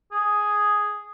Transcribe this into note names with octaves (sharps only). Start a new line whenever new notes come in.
G#4